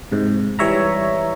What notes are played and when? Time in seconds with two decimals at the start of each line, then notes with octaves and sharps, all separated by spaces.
0.12 G#2 C3
0.59 E3 G3 C#5 E5 A#5